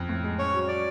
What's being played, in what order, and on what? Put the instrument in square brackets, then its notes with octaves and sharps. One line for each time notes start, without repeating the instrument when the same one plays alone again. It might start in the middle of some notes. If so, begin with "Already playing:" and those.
Already playing: [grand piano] F2
A2
G#3
[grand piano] C#4 [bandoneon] C#5
[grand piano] F#3
[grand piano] C#4 [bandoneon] D5